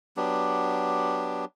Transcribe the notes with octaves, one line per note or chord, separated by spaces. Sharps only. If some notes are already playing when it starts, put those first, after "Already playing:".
F#3 B3 D4 G4